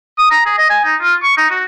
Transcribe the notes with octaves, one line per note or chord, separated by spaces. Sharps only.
D#6
A#5
G#4
D#5
G#5
D#4
F4
C#6
D#4
F#4